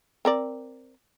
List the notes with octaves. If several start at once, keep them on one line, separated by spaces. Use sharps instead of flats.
C4 A#4 D5